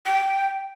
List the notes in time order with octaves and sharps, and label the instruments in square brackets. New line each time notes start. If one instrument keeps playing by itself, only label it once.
[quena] G5